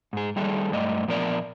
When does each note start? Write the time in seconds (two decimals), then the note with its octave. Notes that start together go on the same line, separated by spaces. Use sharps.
0.13 G#2 G#4
0.36 D#3 G3 G#4 A4
0.72 G2 A3 D5 D#5
1.08 A#2 F3 B3 A#4 B4 D5